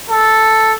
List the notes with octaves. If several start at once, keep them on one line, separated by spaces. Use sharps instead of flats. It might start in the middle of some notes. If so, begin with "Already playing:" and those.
A4